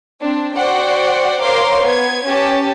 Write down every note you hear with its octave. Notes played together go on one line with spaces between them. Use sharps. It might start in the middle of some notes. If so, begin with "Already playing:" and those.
C4 D4
F#4 C5 D5 F#5 G5
A#4 C5 C#5 F5 C6 D6
B3 G#6
C#4 G4 A5